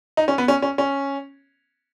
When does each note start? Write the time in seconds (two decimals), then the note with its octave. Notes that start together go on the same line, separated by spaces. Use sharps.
0.17 D#4
0.28 C#4
0.38 B3
0.48 C#4
0.62 C#4
0.78 C#4